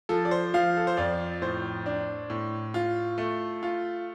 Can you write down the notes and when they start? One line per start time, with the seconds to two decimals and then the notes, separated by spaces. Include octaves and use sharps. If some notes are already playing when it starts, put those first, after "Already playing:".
0.09 F3 A4
0.25 D5
0.31 C5
0.54 F3 F5
0.77 A4
0.87 C5
0.97 F2 D5
1.42 A2 C5
1.86 D4
2.30 A2
2.74 F4
3.18 A3
3.63 F4